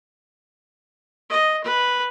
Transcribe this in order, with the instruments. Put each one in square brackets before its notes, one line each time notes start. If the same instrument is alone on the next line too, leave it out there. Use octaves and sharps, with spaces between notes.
[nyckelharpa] D#5
B4